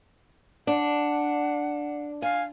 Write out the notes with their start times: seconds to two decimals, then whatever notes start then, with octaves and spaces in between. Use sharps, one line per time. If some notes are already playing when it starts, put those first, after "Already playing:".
0.67 D4 F#5
2.22 F5 G#5